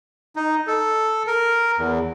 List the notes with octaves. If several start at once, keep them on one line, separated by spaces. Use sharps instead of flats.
D#4
A4
A#4
E2